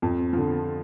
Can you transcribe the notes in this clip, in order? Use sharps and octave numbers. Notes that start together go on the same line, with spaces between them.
F2
D3 F3